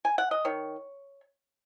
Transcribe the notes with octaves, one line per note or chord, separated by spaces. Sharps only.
G#5
F#5
D#5
D#3 C#5